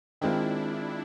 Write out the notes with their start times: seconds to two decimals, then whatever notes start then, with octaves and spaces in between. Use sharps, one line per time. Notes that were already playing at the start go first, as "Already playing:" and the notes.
0.21 D#3 G#3 C4 D4 E4 F4